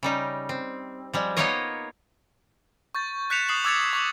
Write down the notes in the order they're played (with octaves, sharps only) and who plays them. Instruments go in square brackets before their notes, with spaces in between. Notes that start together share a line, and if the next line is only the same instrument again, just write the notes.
[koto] C#3 G3 D#4
C4
F3 G3 G#3
A#3 B3 D#4 F4 C#5 D#5
[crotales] C#6 G6 A6
F#6 G6 B6 C#7 E7 F7
D#6 F#6 C7 E7 F#7
D6 E6 G#6 A6 C#7 F7
C#6 D6 F#7